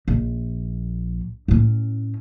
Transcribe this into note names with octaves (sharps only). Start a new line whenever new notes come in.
A#1
A2 C#4